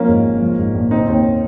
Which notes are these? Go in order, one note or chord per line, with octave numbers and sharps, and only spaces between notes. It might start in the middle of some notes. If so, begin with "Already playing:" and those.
Already playing: F3 A#3 C#4
G#2
G#1
F3
G#2
A#1
C#3 C4 D#4
D#2